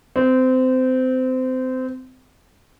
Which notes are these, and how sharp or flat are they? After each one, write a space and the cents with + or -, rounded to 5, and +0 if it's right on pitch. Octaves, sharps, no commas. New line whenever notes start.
C4 -25